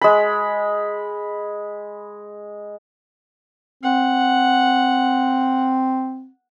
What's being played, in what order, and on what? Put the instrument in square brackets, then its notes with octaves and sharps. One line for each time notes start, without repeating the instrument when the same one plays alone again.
[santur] G#3 B5
[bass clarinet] C4 [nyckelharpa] F#5